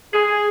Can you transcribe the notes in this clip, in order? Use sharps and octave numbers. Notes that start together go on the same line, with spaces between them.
G#4